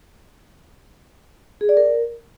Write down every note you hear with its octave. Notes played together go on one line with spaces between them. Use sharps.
G#4
D5
A#4